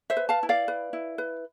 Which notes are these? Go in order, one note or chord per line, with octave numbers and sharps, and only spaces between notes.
C5 E5
B4
F5 A5
E4
D5 F5
B4
E4
B4